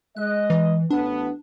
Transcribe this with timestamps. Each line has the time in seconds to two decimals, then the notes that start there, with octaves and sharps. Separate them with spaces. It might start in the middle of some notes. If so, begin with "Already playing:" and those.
0.16 G#3 D#5 F#6
0.50 E3
0.91 A1 B3 D4